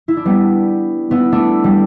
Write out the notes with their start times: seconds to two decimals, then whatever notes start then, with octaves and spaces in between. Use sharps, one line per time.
0.08 E4
0.17 D4
0.25 G3 B3
1.11 B3 E4
1.32 A3 D4
1.64 G3